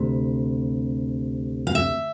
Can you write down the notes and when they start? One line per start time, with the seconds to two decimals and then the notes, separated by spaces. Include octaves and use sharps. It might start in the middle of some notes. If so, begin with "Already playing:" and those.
Already playing: D2 C3
1.67 F5
1.75 E5